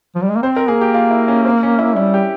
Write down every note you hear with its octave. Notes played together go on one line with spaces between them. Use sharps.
F3
G3
G#3
A#3
C4 C5
A#4
A#3 G#4
G4
F4
E4
C#4
C4
C#4
E4
G3 E4
G4